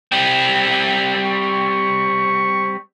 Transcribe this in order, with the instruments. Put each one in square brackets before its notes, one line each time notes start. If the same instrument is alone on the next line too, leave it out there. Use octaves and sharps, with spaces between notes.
[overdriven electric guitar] G3 C4
[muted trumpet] C#6